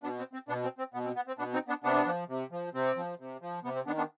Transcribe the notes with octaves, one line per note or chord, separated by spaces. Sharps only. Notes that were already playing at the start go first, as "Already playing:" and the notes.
B2 B3 D4
C4
C4
B2 B3 D4
C4
C4
B2 B3
C4
B3
C4
B2 B3 D4
C4 D#4
B3 D4
C3 B3 D4
F3
C3
F3
C3 C4
F3
C3
F3
C3 B3
C4
D#3 B3 D4
B3 D4